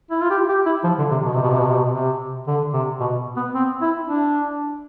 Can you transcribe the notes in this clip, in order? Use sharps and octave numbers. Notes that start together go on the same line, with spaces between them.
E4
F4
G4
G4
E4
F3
D3
C3
B2
C3
B2
C3
B2
C3
B2
C3
D3
C3
B2
B3
C4
E4
D4